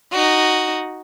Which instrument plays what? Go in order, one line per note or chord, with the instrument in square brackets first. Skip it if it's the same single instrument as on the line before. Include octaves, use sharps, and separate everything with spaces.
[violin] D#4 F#4